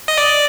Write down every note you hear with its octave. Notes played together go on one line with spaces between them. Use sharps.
D#5
D5